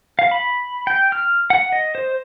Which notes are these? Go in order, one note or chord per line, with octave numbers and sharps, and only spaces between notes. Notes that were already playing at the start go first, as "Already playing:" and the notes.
F5
B5
G5
F6
F#5
D#5
C5